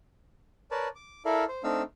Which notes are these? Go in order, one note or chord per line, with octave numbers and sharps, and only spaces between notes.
A#4 B4 C#5 D5 A5
D6
E4 A4 A#4 D5 E5 F5
C5
A3 C4 D4 D#4 F5 E6